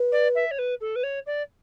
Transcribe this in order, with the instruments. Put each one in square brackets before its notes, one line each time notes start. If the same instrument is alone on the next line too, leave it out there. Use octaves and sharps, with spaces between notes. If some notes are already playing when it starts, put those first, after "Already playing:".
Already playing: [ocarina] B4
[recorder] D5
E5
C#5
B4
A4
B4
C#5
D5